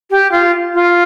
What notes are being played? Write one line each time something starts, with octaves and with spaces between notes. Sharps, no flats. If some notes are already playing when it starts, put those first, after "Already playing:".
G4
F4
F4